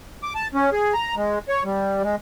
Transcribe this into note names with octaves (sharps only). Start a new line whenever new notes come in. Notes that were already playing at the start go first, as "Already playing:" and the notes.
D6
A5
C#4
G#4
A#5
G#3
C#5
G3
G#3